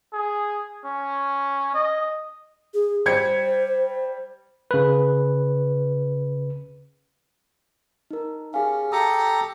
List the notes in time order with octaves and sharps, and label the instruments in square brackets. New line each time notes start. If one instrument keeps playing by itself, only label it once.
[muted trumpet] G#4
C#4
D#5
[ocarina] G#4
[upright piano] G3 G#6 C#7 [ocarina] C5
[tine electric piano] C#3 B4
[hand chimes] D#4 A#4
[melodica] C#4 [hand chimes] G4 G#4 F5
[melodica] G4 A4 A#5 [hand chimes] D#6 C#7